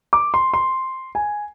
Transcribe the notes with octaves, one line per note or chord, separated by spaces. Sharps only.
D6
C6
C6
G#5